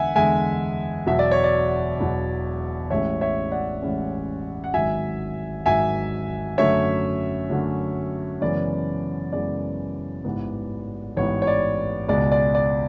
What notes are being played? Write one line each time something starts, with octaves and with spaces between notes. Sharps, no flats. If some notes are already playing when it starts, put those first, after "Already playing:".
Already playing: E2 D3 G#3 E5 F#5 G#5
E2 D3 G#3 E5 G#5
E1 E2 B2 F#3 E5
D5
C#5
D5
E1 E2 B2 F#3
A1 A2 G#3 C#4 C#5 E5
C#5 E5
D5 F#5
A1 A2 G#3 C#4
F#5
G#1 G#2 F#3 E5 G#5
G#1 G#2 F#3 E5 G#5
F#2 D3 F#3 A3 C#4 C#5 E5
F#2 D3 F#3 A3 C#4
F#2 C#3 E3 G#3 B3 D5
F#2 C#3 E3 G#3 B3 D5
A1 G#2 E3 B3
A1 G#2 E3 B3 C#5
C#5
D5
C#2 B2 G#3 D5
D5
D5